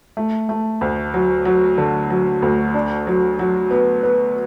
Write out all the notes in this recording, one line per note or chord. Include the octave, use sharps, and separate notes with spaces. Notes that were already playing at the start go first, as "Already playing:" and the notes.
A3
A3
D2
F#3
F#3
D3
F#3
D2
D4
F#3
F#3
B3
B3